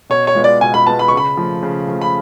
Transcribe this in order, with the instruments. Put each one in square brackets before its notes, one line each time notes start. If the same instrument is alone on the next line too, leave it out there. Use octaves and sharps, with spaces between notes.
[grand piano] B2 [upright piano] C#5
[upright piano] C#5
[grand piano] G#3 B3 F4 B4
[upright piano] D5
[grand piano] B2 [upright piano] G#5
[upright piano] B5
[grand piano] G#3 B3 F4 B4 [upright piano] A5
[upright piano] B5
[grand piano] C#3 [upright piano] C#6
[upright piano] B5
[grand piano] F3 A3 F4
C#3
F3 A3 F4
[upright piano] B5